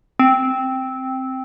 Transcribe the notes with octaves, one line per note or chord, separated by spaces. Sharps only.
C4